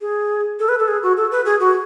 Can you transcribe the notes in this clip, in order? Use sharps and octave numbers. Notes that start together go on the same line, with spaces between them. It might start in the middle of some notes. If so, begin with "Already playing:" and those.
G#4
A4
B4
A4
G#4
F#4
A4
B4
G#4
F#4